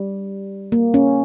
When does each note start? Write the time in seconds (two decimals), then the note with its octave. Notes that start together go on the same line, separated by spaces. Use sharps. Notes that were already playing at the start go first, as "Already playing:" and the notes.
Already playing: G3
0.72 A#3
0.94 C#4